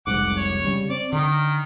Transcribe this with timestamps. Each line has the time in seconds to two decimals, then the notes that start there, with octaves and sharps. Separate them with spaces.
0.07 F1 C2 G#2 F#5 D6
0.37 C#5
0.64 C#3 G3
0.90 C4 D5
1.12 D3 D#3